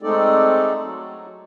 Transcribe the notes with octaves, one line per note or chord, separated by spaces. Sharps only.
G#3 A3 C4 D#4 A4 D5
F#3